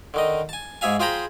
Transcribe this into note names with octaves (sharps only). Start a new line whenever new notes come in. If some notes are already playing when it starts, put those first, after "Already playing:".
D3 D#3 D#5
G#5 A5
G#2 G#4 E5 F5 G#5
F4 G#4 C5 G5 A#5 B5